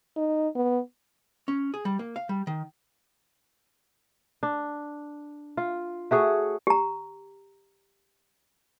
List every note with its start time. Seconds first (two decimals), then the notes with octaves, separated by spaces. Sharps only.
0.17 D#4
0.55 B3
1.48 C#4
1.74 G#4
1.85 G3
1.99 A#3
2.16 F5
2.29 G3
2.47 D#3
4.43 D4
5.57 F4
6.11 A3 F#4 G#4 C#5
6.67 G4 A#5